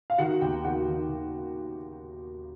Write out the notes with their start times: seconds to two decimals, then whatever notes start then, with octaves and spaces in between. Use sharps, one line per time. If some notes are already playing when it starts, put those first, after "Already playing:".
0.10 F5
0.18 D#3 F#4 F#5
0.41 D#2 G4 G5
0.64 D#2 F#4 F#5
0.87 D#3
1.09 D#3